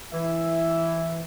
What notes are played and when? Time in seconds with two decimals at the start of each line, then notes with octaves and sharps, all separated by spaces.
0.13 E3 E5